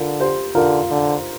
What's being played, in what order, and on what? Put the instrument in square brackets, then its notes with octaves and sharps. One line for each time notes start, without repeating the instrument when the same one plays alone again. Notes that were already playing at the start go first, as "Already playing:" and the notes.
Already playing: [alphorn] D3 [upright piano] F4 A#4
[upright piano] G4 C5
[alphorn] D3 [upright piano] F4 A#4
[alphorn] D3